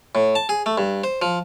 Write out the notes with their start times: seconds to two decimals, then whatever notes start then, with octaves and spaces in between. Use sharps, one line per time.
0.15 A2
0.35 A5
0.49 G#4
0.66 A3
0.78 G2
1.04 C5
1.22 F3